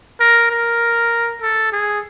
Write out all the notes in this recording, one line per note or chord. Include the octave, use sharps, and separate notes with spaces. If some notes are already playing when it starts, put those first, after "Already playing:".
A#4
A#4
A4
G#4